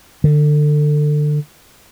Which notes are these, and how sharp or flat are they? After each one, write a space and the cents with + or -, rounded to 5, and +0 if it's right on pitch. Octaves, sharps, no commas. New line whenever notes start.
D3 +25